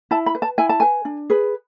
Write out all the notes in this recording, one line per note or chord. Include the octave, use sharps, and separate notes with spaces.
E4 A5
B5
B4
A5
E4 G#5
A5
B4 G#5
D4
G#4 B4